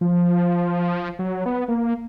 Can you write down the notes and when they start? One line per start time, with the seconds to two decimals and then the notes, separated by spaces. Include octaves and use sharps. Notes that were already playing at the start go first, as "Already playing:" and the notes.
0.01 F3
1.19 F#3
1.46 B3
1.68 A#3